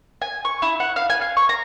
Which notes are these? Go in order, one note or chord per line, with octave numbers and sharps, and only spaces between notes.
G#5
C#6
E4
F#5
F5
G#5
F5
C#6
A#5